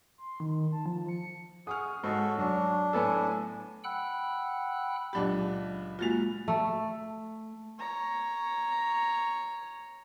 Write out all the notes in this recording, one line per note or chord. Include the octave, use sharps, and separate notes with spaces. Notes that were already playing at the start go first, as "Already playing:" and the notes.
C6
D#3
A5
F3
C#7
G#4 F#5 C#6 D#6 F6
G#2 F#4 A4 C#5
F#3 D4
A2 B3 A4 G#5
F#5 G5 B5 E6 F#6
C#2 A#2 F#3 D4 G4 B5
G#3 A#3 F4 F#4 A6 F7
A3
C#5 A#5